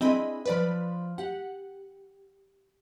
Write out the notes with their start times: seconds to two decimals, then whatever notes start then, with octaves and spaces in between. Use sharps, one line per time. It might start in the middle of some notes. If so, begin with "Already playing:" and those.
0.01 C4 D4 E4 G#4 D#5 B5
0.45 F3 B4 C5 D5 B5
1.18 G4 F#5